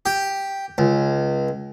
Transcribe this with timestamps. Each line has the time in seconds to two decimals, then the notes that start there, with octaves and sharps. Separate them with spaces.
0.06 G4
0.78 C#2